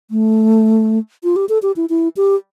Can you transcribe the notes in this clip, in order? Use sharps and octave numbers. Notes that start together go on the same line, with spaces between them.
A3
F4
G4
A4
G4
E4
E4
G4